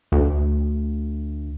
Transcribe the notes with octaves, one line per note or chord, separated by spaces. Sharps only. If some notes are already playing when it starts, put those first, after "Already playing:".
D2